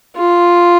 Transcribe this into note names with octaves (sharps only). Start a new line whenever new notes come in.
F4